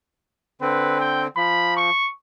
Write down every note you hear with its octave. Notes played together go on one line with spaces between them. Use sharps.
D3 C4 B4
G5
F3 B5
C#6